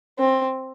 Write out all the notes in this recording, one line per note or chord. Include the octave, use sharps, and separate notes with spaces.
C4